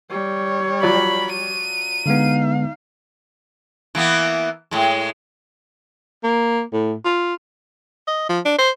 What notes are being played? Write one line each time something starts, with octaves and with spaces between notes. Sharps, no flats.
G3 C#5
F3 F#3 D5 B5
D#7
D3 G#3 B3 D#4 F5
E3 A#3 B3
A2 G#3
A#3
A2
F4
D#5
F3
D4
C5